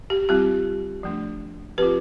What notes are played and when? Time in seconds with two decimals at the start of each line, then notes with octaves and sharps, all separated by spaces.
0.10 G4
0.29 G3 C4 F4 G4
1.03 F3 A3 D4
1.78 F3 C4 F4 G4 B4